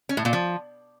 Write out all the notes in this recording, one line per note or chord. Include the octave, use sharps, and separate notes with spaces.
C#4
A2
A#2
F3